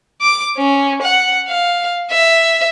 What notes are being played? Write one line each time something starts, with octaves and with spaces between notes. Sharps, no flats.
D6
C#4
F#5
F5
E5